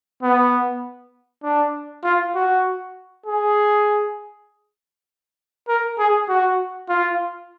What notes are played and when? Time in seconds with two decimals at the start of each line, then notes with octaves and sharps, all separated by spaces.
0.23 B3
1.43 D4
2.04 F4
2.35 F#4
3.26 G#4
5.68 A#4
5.98 G#4
6.29 F#4
6.89 F4